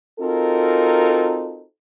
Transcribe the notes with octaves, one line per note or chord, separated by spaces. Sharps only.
C4 D#4 F4 F#4 A4 A#4